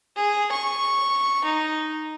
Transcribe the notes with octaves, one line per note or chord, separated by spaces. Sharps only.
G#4
C#6
D#4